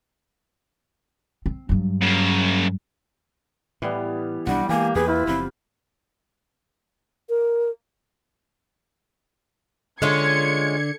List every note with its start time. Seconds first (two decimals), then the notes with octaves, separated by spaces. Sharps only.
1.46 C4
1.69 G2 F#3
2.01 F#2 C#3
3.82 A2 E3 G3 B3
4.47 B1 G3 C4 D4 F#5
4.69 E3 G#3 A#3 G4 G#5
4.95 E2 A#3 G#4 B4
5.08 E4 F4
5.27 F#1 F3 C4 B5
7.29 A#4
10.02 D3 G#3 C#4 F4 G#6 C#7